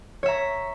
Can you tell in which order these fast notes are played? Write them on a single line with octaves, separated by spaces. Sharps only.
C#5 E5 A#5